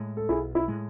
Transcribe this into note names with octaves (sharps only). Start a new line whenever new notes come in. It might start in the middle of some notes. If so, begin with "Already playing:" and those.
Already playing: A2 G#3
A4
B1 E4 G#4
E4
A2 G#3